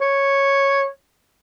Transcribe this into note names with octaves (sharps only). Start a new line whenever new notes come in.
C#5